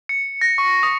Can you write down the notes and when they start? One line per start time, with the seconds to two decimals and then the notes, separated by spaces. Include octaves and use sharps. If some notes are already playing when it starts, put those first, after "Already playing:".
0.09 C#7
0.41 A#6
0.58 C#6
0.83 D#6